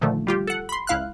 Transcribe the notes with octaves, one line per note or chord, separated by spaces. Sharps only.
A#2 D3 D#3 F3 A3
G3 F4 G4
A4 F#5
B5 C6
C#2 E4 F5 F6 F#6